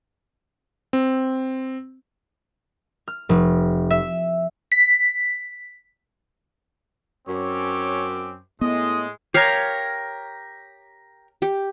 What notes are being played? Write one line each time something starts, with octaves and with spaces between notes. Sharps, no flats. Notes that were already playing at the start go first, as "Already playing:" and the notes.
C4
F6
F1
E5
B6
F#2 C4 C#4 C#5 D6
A2 G#3 B3 D#5
G4 A#4 C#5 F5
G4